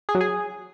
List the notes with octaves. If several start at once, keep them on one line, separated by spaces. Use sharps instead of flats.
G#4
F#3
G#4